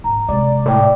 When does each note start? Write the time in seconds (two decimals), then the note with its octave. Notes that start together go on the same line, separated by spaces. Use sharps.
0.04 G#2 A#5
0.28 C3 G#3 D5
0.66 A2 G5 D6